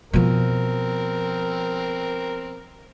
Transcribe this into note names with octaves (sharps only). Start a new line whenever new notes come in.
B2 F3 C4 A#4